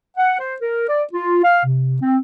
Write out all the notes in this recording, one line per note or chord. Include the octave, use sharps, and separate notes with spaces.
F#5
C5
A#4
D5
F4
F5
C3
C4